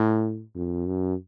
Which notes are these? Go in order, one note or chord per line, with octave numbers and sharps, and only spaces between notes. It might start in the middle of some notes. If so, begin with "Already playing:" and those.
Already playing: A2
F2
F#2